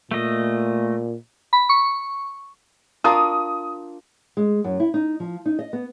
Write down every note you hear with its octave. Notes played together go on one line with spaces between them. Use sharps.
A#2 A3 D#5
B5
C#6
D4 F4 A#4 D#6
G#3
F#2
E4
D#4
F3
D#4
D#5
B3